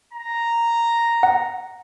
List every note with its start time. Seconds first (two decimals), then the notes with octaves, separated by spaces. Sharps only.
0.13 A#5
1.23 F#5